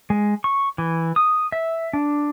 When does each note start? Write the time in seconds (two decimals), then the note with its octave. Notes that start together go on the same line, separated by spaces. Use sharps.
0.10 G#3
0.44 C#6
0.78 E3
1.16 D#6
1.52 E5
1.93 D4